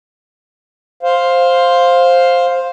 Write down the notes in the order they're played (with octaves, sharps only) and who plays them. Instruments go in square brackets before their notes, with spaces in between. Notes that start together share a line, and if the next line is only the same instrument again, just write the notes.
[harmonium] C5 F5